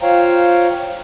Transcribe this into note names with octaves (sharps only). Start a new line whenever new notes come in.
F4 C5 C#5 F5 G5 A#5